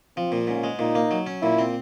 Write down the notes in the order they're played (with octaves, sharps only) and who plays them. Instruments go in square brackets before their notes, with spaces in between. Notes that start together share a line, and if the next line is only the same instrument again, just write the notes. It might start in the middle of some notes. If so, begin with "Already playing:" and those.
[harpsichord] F3 [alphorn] C4
[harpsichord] A#2
[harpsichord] G#2 [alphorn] C#4
[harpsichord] G#3
[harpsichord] A#2 [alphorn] D#4
[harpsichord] A#3
F#3
C#4
[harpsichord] A#2 [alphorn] E4
[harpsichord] C4